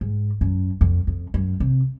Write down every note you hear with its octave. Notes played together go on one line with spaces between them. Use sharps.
G#2
F#2
F2
F2
F#2
C3